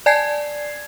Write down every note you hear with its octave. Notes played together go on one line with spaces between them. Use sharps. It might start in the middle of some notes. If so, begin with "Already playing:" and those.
D5 G#5 A5 G#6 C7